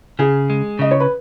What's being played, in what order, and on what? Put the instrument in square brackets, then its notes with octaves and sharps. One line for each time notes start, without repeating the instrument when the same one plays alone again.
[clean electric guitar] C#3 [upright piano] G#4
[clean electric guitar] G#3
[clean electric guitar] C#3 [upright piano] D#5
[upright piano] C#5
B4